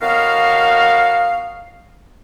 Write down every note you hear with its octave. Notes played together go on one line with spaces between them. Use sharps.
A2 D#3 B3 F#4 F5